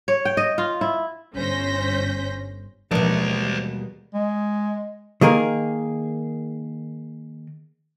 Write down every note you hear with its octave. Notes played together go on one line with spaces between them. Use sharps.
C#5
G5
D#5
F4
E4
G1 C#4 C5 G6 A#6 B6
D#2 B2 E3 F3 G3 G#3 C5 D5
G#3
D#3 A#3 G#4 A#4